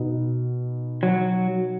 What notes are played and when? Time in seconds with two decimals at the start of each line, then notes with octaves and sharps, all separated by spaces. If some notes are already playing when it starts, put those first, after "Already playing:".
Already playing: B2 B3 D#4
1.03 F#3